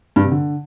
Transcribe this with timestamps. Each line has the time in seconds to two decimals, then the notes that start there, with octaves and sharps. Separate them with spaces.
0.16 G2
0.24 C3
0.32 D3